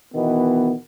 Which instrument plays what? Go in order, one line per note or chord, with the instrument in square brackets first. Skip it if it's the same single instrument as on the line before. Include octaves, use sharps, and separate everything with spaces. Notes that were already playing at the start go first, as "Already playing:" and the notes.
[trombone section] B2 D#3 E3 B3